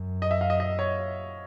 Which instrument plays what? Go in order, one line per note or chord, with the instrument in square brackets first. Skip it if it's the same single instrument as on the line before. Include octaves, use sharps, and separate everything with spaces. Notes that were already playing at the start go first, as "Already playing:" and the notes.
Already playing: [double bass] F#2
[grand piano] D#5
E5
F5
D#5
D#5
C#5